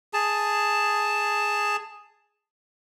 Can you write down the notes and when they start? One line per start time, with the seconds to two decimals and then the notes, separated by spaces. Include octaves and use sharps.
0.13 G#4 A5